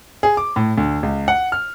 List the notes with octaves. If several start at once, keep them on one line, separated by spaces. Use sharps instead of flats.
G#4
D6
A2
D2
C#2
F#5
F6